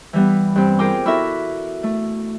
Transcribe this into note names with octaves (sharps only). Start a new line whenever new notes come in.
E3 G3 B3
G2 C4
F4 G#4 A#4 C5 G5 D6
B3 E4 F#4 A4 A#4 E5
A3